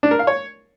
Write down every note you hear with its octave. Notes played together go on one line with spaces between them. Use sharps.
D4
A#4
F5
C#5